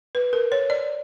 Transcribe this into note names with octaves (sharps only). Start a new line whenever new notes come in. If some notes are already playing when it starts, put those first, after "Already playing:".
B4
A#4
C#5
D5